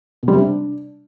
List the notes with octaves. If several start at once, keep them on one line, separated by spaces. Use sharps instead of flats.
B2
G3
C3
D4